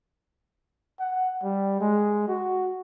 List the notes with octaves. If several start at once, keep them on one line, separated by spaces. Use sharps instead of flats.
F#5
G3
G#3
F#4